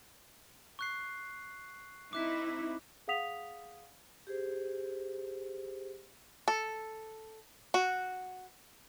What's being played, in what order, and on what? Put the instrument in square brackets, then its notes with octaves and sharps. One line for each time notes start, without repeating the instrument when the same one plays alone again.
[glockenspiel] C#6 F#6 C7
[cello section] C4 D#4 E4 [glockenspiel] D6 F#6 B6
[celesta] G#4 F5 F#5 D#6 B6 F7
[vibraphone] G4 G#4 C5
[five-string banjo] A4
F#4